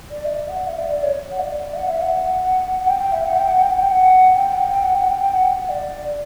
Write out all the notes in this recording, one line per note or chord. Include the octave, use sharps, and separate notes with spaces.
D5
E5
D5
F#5
E5
D5
D5
C#5
F#5
D5
E5
F#5
E5
F#5
F#5
G5
G5
E5
F#5
G5
F#5
G5
F#5
G5
F#5
G5
F#5
G5
F#5
F#5
G5
G5
F#5
F#5
D5